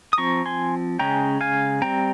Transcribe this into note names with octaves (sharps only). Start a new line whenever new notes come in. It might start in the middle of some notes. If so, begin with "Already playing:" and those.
D#6
F3 C4 A#5 C#6
G#5 C6
C#3 G#3 C#4 G5 A#5
F5 G#5
G3 C4 G5 A#5